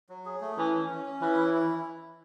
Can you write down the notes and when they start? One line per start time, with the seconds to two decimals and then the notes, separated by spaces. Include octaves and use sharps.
0.09 F#3
0.26 G#4
0.41 A3
0.57 E3 C#4
0.74 C#4
0.90 C#4
1.06 C#4
1.21 E3 B4
1.37 E4
1.54 E4